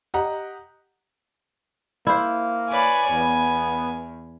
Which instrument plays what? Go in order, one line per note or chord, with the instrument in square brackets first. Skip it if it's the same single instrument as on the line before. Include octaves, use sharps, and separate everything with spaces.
[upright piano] G4 D#5 F#5 A#5
[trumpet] A#3 [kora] E4 C5
[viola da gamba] B4 C#5 D5 [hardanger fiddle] G#5
[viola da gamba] E2 [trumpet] B3